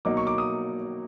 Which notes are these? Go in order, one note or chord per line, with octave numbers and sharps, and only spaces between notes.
B2 F#3 A#3 D#4 D6
C#6
D6
D#6